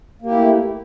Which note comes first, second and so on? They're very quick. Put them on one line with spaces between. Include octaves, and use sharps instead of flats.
A#3 G4 E4 A3